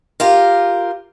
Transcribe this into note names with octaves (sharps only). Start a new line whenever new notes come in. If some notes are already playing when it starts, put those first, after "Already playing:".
F4 G4 A#4